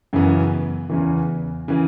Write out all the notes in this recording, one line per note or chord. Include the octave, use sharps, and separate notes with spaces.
F#2 C#3 E3 B3
E2 C#3 E3
C#3 E3